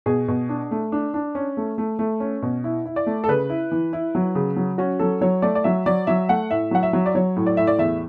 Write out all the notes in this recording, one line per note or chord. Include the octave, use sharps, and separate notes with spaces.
B2 G#4
B2
D4
A3
D4
D4
C#4
A3
A3
A3
C#4
B2
E4
E4
D5
A3
A4
C#3 B4
E4
E3
E4
F#3
C#3
F#3
C#4 F#4
F#3 A4
F#3 C#5
A3 D5
D5
F#3 E5
F#3 D5
F#3 E5
A3 F#5
A2 E5
F#3 F#5
E5
F#3
D5
F#3 C#5
A2
D5
A2 E5
D5
E2 E5